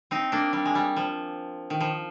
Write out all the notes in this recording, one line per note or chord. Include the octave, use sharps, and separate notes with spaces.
C4 D#4
A#3 D4
G3
G#3
G3
F3
D#3
F3